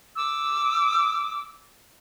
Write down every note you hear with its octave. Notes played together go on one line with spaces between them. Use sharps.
D6 E6